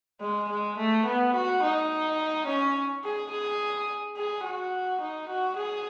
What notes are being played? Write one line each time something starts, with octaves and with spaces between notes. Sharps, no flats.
G#3
G#3
A3
B3
F#4
D#4
C#4
G#4
G#4
G#4
F#4
D#4
F#4
G#4